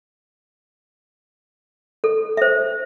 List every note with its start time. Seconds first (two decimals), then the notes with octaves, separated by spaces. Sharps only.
2.04 A4
2.37 C5 E5